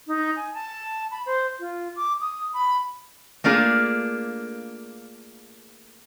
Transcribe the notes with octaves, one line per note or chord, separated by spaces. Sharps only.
D#4
G#5
A5
B5
C5
F4
D6
D#6
B5
A3 A#3 D4 F4 G#4